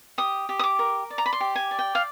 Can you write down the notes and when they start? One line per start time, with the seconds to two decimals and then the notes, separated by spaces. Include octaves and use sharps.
0.18 G4 D#6
0.49 G4
0.59 D#6
0.64 D6
0.79 A#4
1.10 D5
1.18 A#5
1.26 B5
1.33 C6
1.40 G4
1.55 G#5
1.71 D5
1.79 G5
1.95 F5